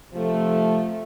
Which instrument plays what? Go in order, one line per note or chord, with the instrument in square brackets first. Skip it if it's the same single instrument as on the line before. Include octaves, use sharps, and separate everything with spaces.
[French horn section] C3 F3 A3